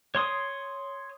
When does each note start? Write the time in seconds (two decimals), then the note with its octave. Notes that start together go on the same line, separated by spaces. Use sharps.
0.15 C#5 C6 D#6